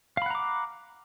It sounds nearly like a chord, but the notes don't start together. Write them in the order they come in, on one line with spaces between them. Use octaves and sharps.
F5 B5 F#5 A#5 D6